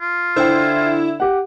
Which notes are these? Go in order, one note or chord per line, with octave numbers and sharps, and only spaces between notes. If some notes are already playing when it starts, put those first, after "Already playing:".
F4
D3 E4 C5 G5
G4 F#5